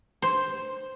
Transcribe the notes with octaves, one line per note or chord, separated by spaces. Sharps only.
C5